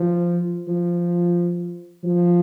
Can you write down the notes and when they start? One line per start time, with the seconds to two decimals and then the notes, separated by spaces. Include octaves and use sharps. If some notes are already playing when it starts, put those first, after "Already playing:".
Already playing: F3
0.68 F3
2.04 F3